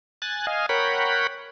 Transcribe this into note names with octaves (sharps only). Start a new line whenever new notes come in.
G#5 F#6 A6
D#5 F5 G#5
A#4 C#5 F#5 G5 B5